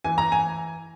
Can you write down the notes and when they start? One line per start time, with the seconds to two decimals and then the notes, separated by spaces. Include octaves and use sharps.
0.04 E3 G#5
0.18 A#5
0.32 G#5